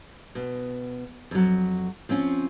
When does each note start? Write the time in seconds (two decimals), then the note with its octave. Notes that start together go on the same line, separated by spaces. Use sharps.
0.35 B2
1.31 F2 F#3
2.09 F3 C4 C#4 F4